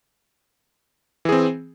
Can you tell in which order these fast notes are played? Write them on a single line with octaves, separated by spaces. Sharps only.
E3 G#4 C4